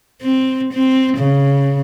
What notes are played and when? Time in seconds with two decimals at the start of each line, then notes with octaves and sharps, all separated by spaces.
0.22 C4
0.73 C4
1.17 C#3